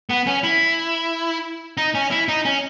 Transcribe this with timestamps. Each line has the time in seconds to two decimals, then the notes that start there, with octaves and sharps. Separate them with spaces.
0.10 B3
0.27 C#4
0.43 E4
1.77 D#4
1.95 C#4
2.11 E4
2.29 D#4
2.45 C#4